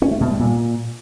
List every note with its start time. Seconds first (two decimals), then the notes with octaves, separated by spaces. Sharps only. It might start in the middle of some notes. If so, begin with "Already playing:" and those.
0.02 C#4
0.11 A3
0.21 B2
0.30 G3
0.39 A#2